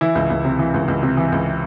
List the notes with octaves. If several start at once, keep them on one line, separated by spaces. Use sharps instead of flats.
E3 E4
C#2
C#2
C3
E3
C#2
C#2
C3
E3
C#2